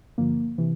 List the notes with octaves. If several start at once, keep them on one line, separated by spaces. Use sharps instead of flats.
G2 D3 F3 A#3
C3 E3